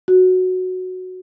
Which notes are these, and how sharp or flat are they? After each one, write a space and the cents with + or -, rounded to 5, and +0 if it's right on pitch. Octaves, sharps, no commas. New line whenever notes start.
F#4 -5